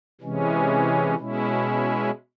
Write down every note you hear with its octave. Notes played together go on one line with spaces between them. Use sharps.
C3 E3 G#3 C#4
B2 G#3 C#4 E4